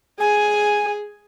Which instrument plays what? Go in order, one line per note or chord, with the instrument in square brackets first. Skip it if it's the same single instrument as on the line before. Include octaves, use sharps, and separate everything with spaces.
[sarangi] G#4 [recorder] G#5